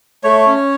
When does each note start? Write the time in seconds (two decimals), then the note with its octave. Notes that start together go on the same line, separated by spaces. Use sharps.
0.24 A3 C#5
0.47 C#4